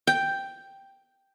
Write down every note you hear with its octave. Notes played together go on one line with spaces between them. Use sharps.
G5